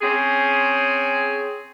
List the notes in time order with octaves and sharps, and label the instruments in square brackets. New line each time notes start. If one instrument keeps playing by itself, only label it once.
[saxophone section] C4 C#4 G#4